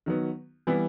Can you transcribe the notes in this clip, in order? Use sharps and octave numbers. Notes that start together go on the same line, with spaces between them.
D#3 F#3 B3
E3 G3 B3 E4